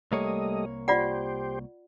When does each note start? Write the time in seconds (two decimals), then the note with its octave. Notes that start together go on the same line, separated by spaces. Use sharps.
0.12 C2 G3 A3 A#3 C#5 D#5
0.88 F4 G4 C5 D5 F#5